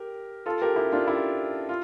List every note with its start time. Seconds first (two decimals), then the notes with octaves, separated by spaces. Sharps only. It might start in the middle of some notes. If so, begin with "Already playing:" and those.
Already playing: G4 A#4
0.46 F4 A4
0.62 G4 A#4
0.76 E4 G4
0.92 D4 F4
1.07 E4 G4
1.69 F4